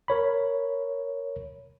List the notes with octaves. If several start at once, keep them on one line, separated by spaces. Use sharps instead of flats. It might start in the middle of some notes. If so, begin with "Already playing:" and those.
A#4 C#5 B5